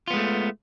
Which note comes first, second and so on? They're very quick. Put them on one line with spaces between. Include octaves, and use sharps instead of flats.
F4 B3 G#3 A3